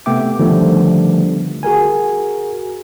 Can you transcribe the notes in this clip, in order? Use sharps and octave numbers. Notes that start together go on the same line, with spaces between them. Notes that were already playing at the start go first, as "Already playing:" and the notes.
C3 A3 B3 E5 G5 D6
D3 D#3 F3 G3 A3 B3
F#4 G#4 A#4 G#5